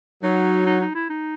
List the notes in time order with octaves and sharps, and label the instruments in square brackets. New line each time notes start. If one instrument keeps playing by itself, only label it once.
[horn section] F#3 [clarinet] D#4
[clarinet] D#4
D#4
E4
D#4